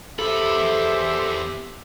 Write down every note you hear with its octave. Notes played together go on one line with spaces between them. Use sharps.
E2 G4 A4 C5 E5 B5